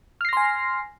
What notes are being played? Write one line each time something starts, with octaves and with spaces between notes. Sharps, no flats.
G#5 C6 F6 A#6 C7